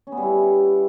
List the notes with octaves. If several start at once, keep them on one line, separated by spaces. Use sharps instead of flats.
C#4
B3
G3
E4